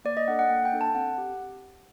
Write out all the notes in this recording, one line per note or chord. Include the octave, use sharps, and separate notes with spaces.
A#3 D5
D#5
D4 A4 F#5
F#5
A#3 G5
G5
D4 A4
A5
C4 F#5
G4